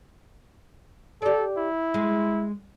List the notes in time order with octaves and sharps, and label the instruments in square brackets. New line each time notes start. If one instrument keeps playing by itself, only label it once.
[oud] G4 D5 [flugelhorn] A4
[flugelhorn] E4
[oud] G#3